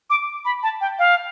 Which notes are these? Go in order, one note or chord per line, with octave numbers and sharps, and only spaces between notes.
D6
B5
A5
G5
F5